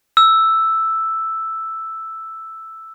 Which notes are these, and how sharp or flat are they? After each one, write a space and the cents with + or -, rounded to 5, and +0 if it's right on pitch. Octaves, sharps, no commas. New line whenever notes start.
E6 +0